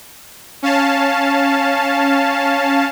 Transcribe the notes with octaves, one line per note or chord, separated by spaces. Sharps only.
C#4 F5 A5